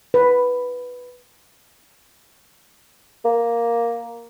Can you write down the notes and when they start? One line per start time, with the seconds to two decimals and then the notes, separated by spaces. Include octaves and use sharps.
0.14 B4
3.25 A#3